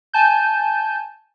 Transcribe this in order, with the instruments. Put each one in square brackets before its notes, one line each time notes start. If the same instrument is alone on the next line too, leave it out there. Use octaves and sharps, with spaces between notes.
[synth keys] G#5 A5 G6